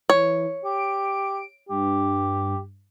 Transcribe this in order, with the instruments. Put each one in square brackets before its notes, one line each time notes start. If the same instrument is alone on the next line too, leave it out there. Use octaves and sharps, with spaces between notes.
[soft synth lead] E3 [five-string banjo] C#5
[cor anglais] G4 [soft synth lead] D7
[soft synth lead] G2 [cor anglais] G4